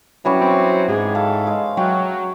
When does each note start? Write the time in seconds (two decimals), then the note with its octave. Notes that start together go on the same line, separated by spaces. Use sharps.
0.25 E3 F#3 G3 C#4
0.41 C4
0.88 G#2 G#4
1.15 A4 F5
1.47 G#3
1.77 F#3 F#4 F#5 G5